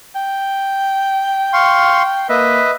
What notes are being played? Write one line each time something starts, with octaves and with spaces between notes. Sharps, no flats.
G5
F5 C6 C#6
A#3 B4 D#5 E5